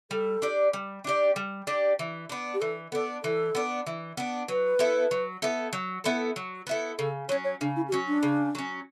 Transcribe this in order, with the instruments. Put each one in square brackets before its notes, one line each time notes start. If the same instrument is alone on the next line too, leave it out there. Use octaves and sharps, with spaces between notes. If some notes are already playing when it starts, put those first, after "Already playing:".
[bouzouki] G3 [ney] A4
[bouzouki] D4 G4 D5
G3
D4 G4 D5
G3
D4 G4 D5
E3
B3 D4
[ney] G4
[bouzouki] E3 [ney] A4
[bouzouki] B3 D4 [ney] A4
[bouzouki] E3 [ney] A4
[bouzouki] B3 D4
E3
B3 D4
[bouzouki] F#3 [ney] B4
[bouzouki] B3 E4 A4
F#3
B3 E4 A4
F#3
B3 E4 A4
F#3
B3 E4 A4
[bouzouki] C#3 [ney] A4
[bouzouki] F#3 C#4 [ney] C#5
[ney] C#5
[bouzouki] C#3 [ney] D4
[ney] E4
G4
[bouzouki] F#3 C#4 [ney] F#4
[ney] D4
[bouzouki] C#3
F#3 C#4